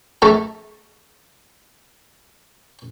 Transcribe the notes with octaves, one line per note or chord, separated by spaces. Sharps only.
A3 A#5